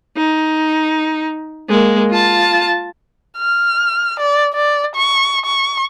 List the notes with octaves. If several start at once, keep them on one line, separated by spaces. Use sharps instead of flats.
D#4
G#3 A#3
F4 A5
F6
D5
D5
C#6
C#6